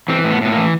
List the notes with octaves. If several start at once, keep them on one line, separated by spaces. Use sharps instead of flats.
E3 C4
A2
B3
A2 B3
A#3
E3